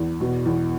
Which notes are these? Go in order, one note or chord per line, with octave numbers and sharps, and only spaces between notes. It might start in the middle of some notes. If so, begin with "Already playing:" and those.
Already playing: E2
B2
E2